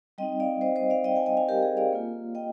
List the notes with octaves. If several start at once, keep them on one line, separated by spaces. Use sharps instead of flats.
G3 C4 D#4 D#5 G5
D5 F5
C5 D#5
C5 D#5
D5 F5
D#5 G5
F5 G#5
D#5 G5
F5 G#5
G4 A#4
G#4
D5 F5
A#3 F4
D#5 G5